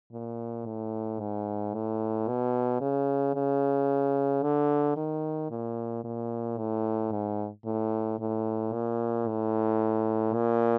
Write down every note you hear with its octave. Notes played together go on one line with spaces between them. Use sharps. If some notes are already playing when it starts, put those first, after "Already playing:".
A#2
A2
G#2
A2
B2
C#3
C#3
D3
D#3
A#2
A#2
A2
G#2
A2
A2
A#2
A2
A#2